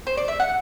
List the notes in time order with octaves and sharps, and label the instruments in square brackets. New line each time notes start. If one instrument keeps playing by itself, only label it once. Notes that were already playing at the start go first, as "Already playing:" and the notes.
[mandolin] C5
D5
E5
F#5